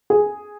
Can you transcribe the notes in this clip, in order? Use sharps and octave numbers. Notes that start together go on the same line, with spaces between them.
G#4